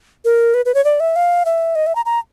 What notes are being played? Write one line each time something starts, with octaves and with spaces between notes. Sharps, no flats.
A#4
B4
B4
C#5
D5
E5
F5
E5
D#5
E5
A#5
A#5